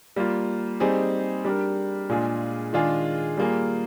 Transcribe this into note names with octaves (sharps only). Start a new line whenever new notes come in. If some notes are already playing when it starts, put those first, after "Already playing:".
G3 A#3 F4
G3 C4 D#4 G#4
G3 D4 G4 A#4
A#2 G#3 D4 F4 G#4
D#3 G#3 D4 F4 G#4
G3 A#3 F4 G#4